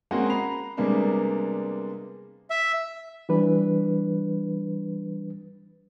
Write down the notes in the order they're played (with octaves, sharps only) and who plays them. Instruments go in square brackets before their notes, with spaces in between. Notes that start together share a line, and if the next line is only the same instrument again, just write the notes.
[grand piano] G#3 A#3 C4 C#4 F#4 F#5
A#5 B5 C7 F7
C3 G3 G#3 A#3 B3 D4
[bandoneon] E5
[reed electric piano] E3 G3 D4 B4